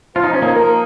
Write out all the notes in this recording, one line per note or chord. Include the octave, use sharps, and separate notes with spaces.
F3 F4
D#4
F3 C#4
A#3 D#4
A#3 D#4 A#4